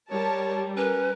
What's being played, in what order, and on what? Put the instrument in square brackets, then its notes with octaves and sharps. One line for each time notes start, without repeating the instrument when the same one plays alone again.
[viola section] G3 [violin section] A#4 A5 [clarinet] C#5
[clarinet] C#4 [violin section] A#4 [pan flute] B4